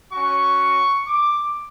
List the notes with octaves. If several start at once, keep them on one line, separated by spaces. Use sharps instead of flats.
C#4 F#4 C#6
D6